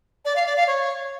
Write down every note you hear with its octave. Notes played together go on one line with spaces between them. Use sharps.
D5
F5
D5
F5
C#5